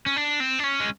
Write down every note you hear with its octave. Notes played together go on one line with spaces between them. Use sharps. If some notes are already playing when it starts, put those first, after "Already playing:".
C#4
D4
C4
D4
C#4
G#3